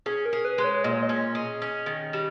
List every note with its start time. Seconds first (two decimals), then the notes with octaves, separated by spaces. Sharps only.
0.06 C#4 G#4
0.25 A#4
0.33 G#4
0.45 B4
0.58 G#3 B4
0.64 C#5
0.84 A#2 D#5
0.93 C#5
1.03 D#5
1.09 C#4
1.35 G#4
1.62 C#4
1.86 D#3
2.13 G3